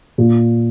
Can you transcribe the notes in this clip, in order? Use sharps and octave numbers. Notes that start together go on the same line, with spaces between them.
A#2